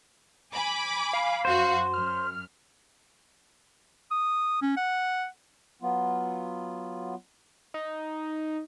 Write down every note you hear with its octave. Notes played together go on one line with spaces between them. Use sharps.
G#5 B5 D6
F5
F#2 F#4 C5
F#2 F6
D#6
C#4
F#5
F#3 B3 F4
D#4